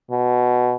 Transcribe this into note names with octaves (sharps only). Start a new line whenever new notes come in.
B2